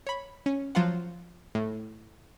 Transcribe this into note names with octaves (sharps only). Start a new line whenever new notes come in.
C#5 B5
C#4
F3 F#3 F4 C5 F#5
A2